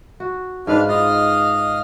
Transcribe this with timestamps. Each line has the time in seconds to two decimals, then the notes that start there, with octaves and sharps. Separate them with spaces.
0.20 F#4
0.67 G#2 D4 B4 F5
0.89 F4 D#5 F5